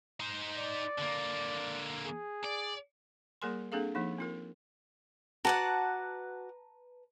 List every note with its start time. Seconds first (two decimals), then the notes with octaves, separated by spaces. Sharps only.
0.20 D#4 C5
0.56 D5
0.98 D3 A#3
2.04 G#4
2.44 D5
3.42 G3 A#3 G#4 A#4 G#5 C6
3.72 A#3 C4 D4 G#4 A4 F5
3.95 F3 A#3 D#4
4.18 C4 F4 A#4
5.45 F#4 B4 D5 F#5 A5 A#5